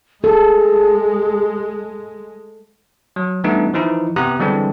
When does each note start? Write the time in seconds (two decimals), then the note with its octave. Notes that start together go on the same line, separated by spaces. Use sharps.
0.24 G#3 G#4 A4
3.16 F#3
3.44 E3 G3 A3 B3 D4 D#4
3.73 E3 F3 D#4 E4
4.16 C3 B3 G4 A#5 D#6 F#6
4.39 D3 E3 G3 G#3 C4 D4